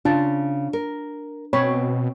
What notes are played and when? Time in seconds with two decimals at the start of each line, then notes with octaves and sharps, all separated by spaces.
0.05 C#3 D4 F4 A5
0.73 A#4
1.53 B2 C4 C#5 B5